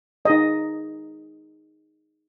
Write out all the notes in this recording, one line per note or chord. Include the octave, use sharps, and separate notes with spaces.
D#4 G#4 B4 D#5